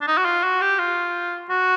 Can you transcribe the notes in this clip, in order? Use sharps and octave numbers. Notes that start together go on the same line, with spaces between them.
D4
D#4
F#4
F4
F#4
G4
F4
F#4